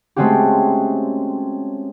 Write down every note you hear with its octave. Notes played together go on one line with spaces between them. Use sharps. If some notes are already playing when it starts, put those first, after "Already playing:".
G#3 A3 C4 C#4 F#4 G4